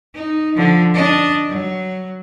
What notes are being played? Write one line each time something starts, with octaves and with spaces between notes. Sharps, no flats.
D#4
D3 F3
D4 D#5
F#3